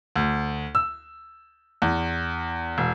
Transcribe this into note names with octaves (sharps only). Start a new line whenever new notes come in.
D2
E6
E2
E1